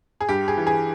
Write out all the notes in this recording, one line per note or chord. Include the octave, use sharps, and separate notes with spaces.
G#4
G2 G4
G#4
E3
G#4